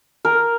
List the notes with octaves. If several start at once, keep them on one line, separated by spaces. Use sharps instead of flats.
A#4